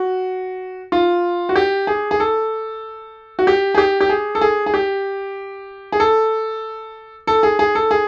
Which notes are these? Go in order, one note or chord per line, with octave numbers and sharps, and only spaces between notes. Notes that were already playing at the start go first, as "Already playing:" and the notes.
Already playing: F#4
F4
F#4
G4
G#4
G#4
A4
F#4
G4
G#4
G4
G4
G#4
A4
G#4
G#4
G4
G#4
A4
A4
G#4
G#4
A4
G#4